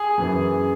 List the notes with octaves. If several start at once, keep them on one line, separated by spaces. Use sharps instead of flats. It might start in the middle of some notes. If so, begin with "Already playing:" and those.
Already playing: G#4
F#2 E3